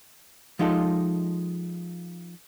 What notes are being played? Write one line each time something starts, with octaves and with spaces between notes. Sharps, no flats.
F3 G#3 D#4 F4 G4 A4